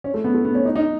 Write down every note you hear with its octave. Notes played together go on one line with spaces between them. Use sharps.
C#4
A3
B3
A3
B3
C#4
D#4
D#4